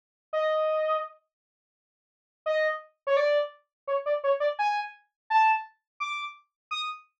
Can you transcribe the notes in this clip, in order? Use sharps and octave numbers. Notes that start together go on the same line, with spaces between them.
D#5
D#5
C#5
D5
C#5
D5
C#5
D5
G#5
A5
D6
D#6